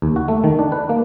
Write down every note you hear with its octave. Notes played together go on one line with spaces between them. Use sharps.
D#2
F#4
A3
D#3
D4
B4
A#3